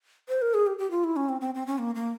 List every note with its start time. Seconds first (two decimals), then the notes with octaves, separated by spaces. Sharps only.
0.28 C5
0.42 A#4
0.54 G#4
0.67 G4
0.78 G4
0.91 F4
1.04 E4
1.16 C#4
1.29 C4
1.41 C4
1.55 C4
1.67 C#4
1.78 A#3
1.95 A#3